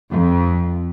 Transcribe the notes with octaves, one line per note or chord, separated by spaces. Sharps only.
F2